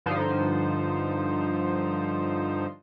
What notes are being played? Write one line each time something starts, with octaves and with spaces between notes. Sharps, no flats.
G2 D3 F3 D#4 C5